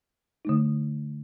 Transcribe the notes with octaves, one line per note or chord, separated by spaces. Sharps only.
D3 A3 D#4